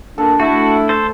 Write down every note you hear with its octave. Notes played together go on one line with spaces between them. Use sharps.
A#2 D4 A4
A3 E4 F#4
A4 C5